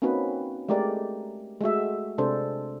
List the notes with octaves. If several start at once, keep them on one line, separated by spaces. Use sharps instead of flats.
A#3 C4 C#4 D#4 F#4 B4
G#3 A3 G4 A#4 D5
G#3 A3 F#4 E5
C3 G#3 D4 A4 C5